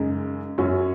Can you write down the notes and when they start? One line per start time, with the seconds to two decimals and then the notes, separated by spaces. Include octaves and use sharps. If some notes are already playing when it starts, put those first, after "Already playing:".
Already playing: F#2 C#3 G#3 D#4
0.58 F#2 F#3 C#4